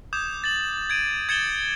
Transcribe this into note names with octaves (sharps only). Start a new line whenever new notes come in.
D6 D#6 G6 G#6 E7
A6 F#7
G#6 D7 D#7 F#7
G#6 A6 C#7 E7 F#7 G7